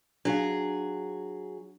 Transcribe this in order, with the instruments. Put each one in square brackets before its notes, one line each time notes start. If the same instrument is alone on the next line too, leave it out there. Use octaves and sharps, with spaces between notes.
[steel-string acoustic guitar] F#3 G#4 [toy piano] D4 D#4 F5